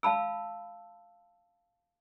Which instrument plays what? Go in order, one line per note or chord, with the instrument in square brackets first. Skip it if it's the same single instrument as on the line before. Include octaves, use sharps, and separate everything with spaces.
[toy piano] F5 A5 B5 E6